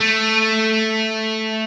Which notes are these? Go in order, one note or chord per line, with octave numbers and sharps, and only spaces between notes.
A3